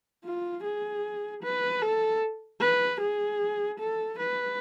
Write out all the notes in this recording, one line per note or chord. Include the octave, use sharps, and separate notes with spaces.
F4
G#4
B4
A4
B4
G#4
A4
B4